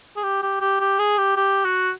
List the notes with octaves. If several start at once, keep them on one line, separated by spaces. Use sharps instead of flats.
G#4
G4
G4
G4
G4
G#4
G4
G4
F#4